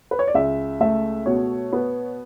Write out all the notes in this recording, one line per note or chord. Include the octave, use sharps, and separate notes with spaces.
B4
C#5
D5
C#2 E5
A3 E5
B2 C#5
B3